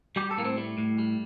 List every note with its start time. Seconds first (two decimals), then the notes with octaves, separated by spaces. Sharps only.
0.16 G3 G4
0.31 A4
0.38 A2 A#3
0.45 C4
0.57 G3 A3
0.78 A2
0.99 G3